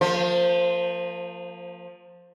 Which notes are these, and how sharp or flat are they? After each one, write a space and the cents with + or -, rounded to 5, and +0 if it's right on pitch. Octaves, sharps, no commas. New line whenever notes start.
F3 +15 A#3 -30 C5 +0